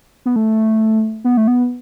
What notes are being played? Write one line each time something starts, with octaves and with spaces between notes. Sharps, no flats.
B3
A3
B3
A3
B3